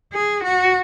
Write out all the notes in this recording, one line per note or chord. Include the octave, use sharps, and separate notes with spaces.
G#4
F#4